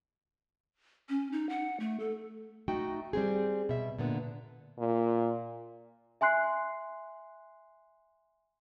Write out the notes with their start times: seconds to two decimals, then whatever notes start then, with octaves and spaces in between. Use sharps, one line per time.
1.09 C#4
1.32 D#4
1.49 F#5
1.80 A3
2.00 A4
2.68 A3 D#4 F#4 G5
3.13 G3 C4 G#4
3.69 B2 E5
3.98 A#2 D3 B3
4.79 A#2
6.21 E5 G#5 C6 F#6 C7